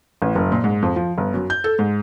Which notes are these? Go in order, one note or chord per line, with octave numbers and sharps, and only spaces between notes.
A1
F#1
A#2
G#2
F2
F3
G1
F#2
G6
A4
G#2